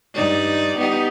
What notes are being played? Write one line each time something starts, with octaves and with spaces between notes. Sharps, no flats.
G2 D#4 D5
B3 D#4 G4